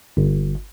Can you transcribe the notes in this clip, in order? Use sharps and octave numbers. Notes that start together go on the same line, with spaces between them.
G1